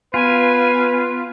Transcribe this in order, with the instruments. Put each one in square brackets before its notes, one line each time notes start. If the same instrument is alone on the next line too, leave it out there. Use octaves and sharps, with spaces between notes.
[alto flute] B3 [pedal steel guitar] F4 [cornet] B4 [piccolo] G#5